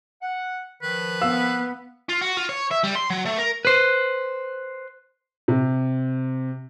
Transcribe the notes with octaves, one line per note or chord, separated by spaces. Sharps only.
F#5
D#3 F3 B4
B3 F5 E6
F4
F#4
F4
C#5
E5
G3
C6
F#3
A3
A#4
B4 C5
C3